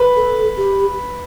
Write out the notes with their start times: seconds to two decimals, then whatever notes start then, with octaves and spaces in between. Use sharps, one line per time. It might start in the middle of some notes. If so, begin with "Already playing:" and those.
Already playing: B4
0.16 A4
0.57 G4